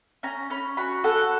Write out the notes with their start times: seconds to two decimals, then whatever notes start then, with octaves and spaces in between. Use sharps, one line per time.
0.23 C#4 A#5
0.50 C#4 B5
0.77 F#4 B5
1.04 A4 F#5